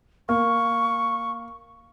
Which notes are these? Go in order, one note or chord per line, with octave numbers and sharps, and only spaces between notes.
A#3 C#6